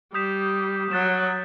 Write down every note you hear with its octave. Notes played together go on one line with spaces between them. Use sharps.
G3 D#6 G6 B6 E7
F#3 F#6 A6 E7